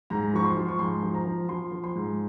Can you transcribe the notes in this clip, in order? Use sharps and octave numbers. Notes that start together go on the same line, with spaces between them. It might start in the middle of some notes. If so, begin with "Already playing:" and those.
G#2 A#5
F3 C#6
C6
F3
C#6
G#2 C6
F3
A#5
F3
F3 C6
F3
C6
G#2